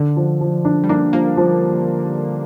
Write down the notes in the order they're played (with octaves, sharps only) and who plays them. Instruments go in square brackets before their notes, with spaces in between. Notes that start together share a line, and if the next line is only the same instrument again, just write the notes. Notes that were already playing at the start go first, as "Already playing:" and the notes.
Already playing: [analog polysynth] D3 [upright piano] D4
[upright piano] F3
F3
D4
[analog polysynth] G3
[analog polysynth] A#3 [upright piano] D4
[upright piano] F3 [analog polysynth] A#3
[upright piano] F3